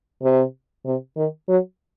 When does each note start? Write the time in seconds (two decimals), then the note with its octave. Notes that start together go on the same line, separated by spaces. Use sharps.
0.23 C3
0.86 C3
1.16 D#3
1.48 F#3